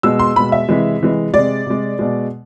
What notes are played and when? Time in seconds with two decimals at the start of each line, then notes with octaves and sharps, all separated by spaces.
0.03 B2 G#3 E6
0.19 C6
0.36 B2 G#3 B5
0.52 E5
0.69 C3 E3 G#3
1.01 C3 E3 G#3
1.33 C3 G#3 D5
1.66 C3 G#3
1.99 B2 G#3